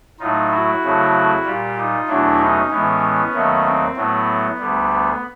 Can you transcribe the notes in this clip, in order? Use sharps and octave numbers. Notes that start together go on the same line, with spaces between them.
A2 F#3 A3 D#4 F4
E4 F#4
F2 C#3 F#3 A3
A#2 G3 F4 G4
D#4 F4
E2 B2 F#3 A3 D4 E4
C#4 D#4
A2 E3 G#3 B3 C#4
D#2 D#3 F#3 A3
C4
A2 F#3 A3 B3
D2 D3 G3
B3